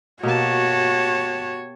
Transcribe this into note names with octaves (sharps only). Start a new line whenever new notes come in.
B2 A#3 F#4 G4 C#5 A5